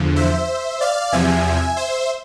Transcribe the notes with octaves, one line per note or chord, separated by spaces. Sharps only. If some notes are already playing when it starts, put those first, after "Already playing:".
Already playing: E2 D3 F3
C5 E5
D5 F5
E2 C3 F3 E5 G#5
C5 E5